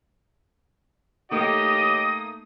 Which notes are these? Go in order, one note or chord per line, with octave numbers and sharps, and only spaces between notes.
A3 A#3 D#4 G4 D#5 D6 D#6